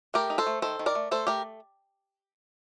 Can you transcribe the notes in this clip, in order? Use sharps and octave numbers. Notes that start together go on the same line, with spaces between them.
A3 G4 A#4
D#4
A4 C5
A3
D#3 A4 C5
D#3
A#4 D5
A3
A3 A4 C5
A3 G4 A#4